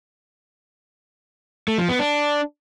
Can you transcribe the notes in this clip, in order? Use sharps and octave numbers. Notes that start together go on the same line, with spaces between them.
A3
F3
B3
D4